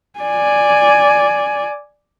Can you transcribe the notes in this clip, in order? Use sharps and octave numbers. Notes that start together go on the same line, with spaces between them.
D5 G#5